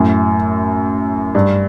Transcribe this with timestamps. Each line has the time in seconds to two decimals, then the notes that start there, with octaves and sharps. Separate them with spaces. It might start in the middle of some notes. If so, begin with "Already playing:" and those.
Already playing: F#2 A2
1.35 G2